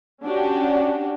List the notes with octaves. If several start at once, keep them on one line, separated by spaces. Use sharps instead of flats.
C#4 D4 F#4 G4